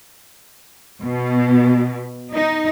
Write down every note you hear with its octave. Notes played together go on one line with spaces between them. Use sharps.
B2
D#4